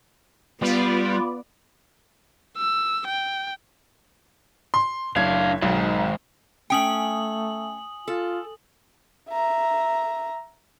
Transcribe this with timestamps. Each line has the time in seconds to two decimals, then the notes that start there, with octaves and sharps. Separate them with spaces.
0.62 G3 B3 F4 B4 D5
2.58 E6
3.07 G5
4.74 C6
5.16 F#1 D4 F5 G#6
5.62 B1 G#2 D#3
6.70 A3 C#4 G5 G#5 D#6 F#7
8.08 F4 A4
9.30 E5 A#5